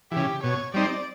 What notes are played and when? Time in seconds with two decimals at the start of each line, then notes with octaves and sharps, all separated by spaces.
0.11 C#3 E3 G4
0.43 B2 C#5
0.74 G3 C4 D#4 D5